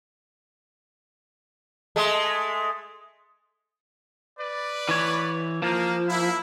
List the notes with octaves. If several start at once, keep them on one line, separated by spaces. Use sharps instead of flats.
G#3 A3
B4 D5
E3 C#5
F3 A#3
A#3 E4